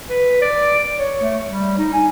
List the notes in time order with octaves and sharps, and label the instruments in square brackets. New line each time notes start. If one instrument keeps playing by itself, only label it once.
[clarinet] B4
D5
C#5
A3
G3
D#4
G#5